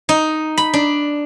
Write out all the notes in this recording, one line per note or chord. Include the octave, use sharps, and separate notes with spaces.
D#4
B5
D4